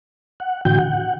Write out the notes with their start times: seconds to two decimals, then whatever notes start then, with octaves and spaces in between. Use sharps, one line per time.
0.40 F#5
0.65 A2 D3 E3 F#4 G5 G6
0.79 F#5